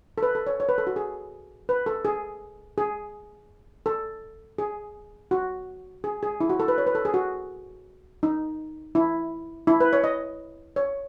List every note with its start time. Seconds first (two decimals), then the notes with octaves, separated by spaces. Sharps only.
0.18 A4
0.23 B4
0.35 A4
0.47 C#5
0.60 C#5
0.69 B4
0.78 A4
0.87 F#4
0.96 G#4
1.69 B4
1.86 A4
2.05 G#4
2.78 G#4
3.86 A4
4.58 G#4
5.31 F#4
6.04 G#4
6.23 G#4
6.40 E4
6.50 F#4
6.60 A4
6.68 B4
6.78 C#5
6.87 B4
6.95 A4
7.05 G#4
7.14 F#4
8.23 D#4
8.95 E4
9.67 E4
9.80 B4
9.93 C#5
10.04 D#5
10.76 C#5